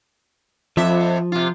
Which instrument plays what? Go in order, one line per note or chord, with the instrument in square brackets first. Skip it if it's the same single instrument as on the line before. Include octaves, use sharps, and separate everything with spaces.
[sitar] F2 E5 [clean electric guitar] F3
[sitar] C3 F4